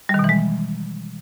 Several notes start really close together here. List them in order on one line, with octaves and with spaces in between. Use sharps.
G3 D#3 B2 E3 G#3